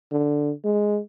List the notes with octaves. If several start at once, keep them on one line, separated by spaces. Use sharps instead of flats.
D3
G#3